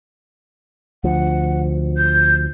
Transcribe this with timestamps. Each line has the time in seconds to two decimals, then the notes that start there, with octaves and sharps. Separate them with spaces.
1.04 D2 F3 F#5
1.97 G6